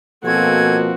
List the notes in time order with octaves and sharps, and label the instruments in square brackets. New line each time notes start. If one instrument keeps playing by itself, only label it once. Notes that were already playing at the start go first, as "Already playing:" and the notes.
[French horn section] B2 F3 A#3 [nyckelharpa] C4 F#4 [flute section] A4 G#5 G#6